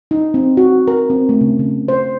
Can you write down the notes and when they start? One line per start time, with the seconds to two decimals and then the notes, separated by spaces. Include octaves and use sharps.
0.11 D#4
0.34 C4
0.57 F#4
0.88 A#4
1.10 C4
1.29 A3
1.41 C#3
1.59 C#3
1.88 C5